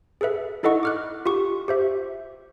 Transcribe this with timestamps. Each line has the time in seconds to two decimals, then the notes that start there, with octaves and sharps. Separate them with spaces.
0.21 G#4 A4 B4 E5
0.63 D#4 E4 A4 D#5 F#5 C#6
0.83 D6 F6 F#6
1.26 F4 G4 C#6
1.68 G4 C5 E5